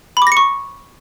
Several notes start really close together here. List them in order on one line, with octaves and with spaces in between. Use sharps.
B5 D6 A#6 C#7 C#6